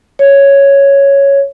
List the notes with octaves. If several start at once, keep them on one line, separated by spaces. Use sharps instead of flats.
C#5